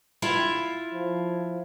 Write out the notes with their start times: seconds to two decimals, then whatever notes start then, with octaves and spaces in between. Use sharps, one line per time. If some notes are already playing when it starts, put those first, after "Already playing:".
0.22 E4 F4 E5
0.94 F3